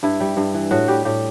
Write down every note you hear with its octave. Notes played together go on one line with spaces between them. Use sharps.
G2 E4
G3
G2
E3
A2 F#4
G3 G4
A2 G4